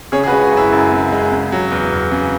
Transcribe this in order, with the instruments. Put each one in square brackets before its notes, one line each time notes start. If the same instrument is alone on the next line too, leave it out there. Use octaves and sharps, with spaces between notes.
[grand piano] C#3 G#4 C#5
G#4
F#4 B4
G#3
F#4
F#2
E4
F#2
C#3
G#3
C#3
F#3
E2
E2
C#3